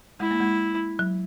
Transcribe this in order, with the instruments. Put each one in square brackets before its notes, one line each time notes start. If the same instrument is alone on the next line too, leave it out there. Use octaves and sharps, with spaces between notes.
[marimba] G#3 [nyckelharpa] E4
[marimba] A#3
G#3
F#3